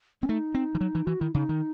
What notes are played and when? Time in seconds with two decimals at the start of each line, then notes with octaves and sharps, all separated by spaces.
0.22 C4 C#4
0.29 A3 D#4
0.55 C4
0.75 E3
0.81 F#3
0.95 E3
1.06 E3 F#4
1.20 D#3 E4
1.34 C#3 D#4
1.49 D#3